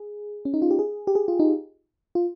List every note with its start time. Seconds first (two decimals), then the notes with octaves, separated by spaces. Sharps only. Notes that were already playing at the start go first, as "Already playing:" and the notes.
Already playing: G#4
0.45 C#4
0.54 D#4
0.62 F4
0.71 G4
0.79 G#4
1.07 G4
1.15 G#4
1.28 F4
1.39 D#4
2.15 F4